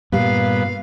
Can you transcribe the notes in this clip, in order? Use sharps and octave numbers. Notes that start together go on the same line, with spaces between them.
G2 A#2 G3 B3 F5